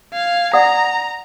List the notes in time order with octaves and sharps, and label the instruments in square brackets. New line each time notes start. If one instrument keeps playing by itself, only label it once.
[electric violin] F5 G#6
[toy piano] D5 F#5 D#6 [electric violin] A#5